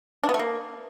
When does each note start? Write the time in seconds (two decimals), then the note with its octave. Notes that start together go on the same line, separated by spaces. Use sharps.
0.24 D4
0.29 B3
0.34 A3
0.39 A#3